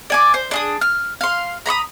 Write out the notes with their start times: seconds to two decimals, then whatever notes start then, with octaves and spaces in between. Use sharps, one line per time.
0.10 D5 G#5 D6
0.34 C5
0.51 D4 G#4 D#6
0.81 F6
1.21 F5 C6
1.66 A#5 B5 C#6 D#6